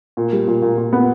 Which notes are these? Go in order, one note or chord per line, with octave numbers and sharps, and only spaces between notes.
A#2
G3
A#2
A#2
A#2
B3